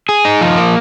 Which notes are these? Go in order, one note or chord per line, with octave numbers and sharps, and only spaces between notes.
G#4
D#4
F3
A#3